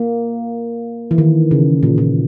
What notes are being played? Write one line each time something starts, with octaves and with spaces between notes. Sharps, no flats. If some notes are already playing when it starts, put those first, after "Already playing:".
Already playing: A#3
E3
D#3
C#3
A#2
A#2